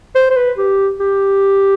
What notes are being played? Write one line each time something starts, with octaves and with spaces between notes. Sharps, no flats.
C5
C5
B4
G4
G4